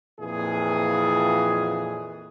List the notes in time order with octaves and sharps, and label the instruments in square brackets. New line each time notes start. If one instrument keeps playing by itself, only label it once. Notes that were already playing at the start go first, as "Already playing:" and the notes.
[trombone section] F2 A#2 E3 G#4